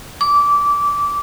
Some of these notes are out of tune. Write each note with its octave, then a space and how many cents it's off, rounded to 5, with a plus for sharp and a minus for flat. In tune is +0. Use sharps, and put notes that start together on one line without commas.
D6 -20